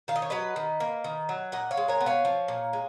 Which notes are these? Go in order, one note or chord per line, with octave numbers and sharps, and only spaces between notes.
D#3 F5
D#5
C#5
F#3 B4 D#5
D#3
A#3
D#3
F#3
A#2 D#5 F#5
C#5 F5
G#3
A#4 C#5
B3
C#5 F5
F3
A#2
G#3